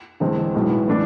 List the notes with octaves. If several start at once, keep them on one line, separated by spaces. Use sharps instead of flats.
E2 D3 G#3 C4
B1 A2 G#3 B3
E3 A3 D4